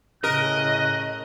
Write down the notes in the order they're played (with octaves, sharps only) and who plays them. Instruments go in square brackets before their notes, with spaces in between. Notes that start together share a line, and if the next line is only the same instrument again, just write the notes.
[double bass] A2 C#3 [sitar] A#4 [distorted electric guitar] D#5 [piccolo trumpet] F#6